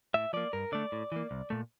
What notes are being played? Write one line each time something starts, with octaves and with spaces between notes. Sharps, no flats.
A2 E5
F3 A#3 D5
G2 A#4
D3 A3 D5
A2
E3 A#3
C2
A#2 A3